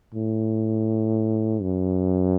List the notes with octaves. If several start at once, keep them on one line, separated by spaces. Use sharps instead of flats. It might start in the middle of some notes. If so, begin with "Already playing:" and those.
A2
F#2